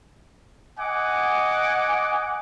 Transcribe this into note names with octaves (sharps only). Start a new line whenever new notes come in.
D#5 F#5 G#5 D6